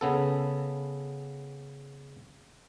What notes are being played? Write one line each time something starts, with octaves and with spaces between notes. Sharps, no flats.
C#3 B3 A4